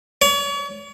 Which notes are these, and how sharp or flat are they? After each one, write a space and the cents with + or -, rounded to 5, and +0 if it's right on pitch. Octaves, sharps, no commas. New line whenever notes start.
C#5 +40